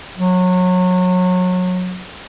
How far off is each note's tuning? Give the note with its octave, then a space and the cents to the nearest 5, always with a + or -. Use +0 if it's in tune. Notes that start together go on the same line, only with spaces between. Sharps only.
F#3 -25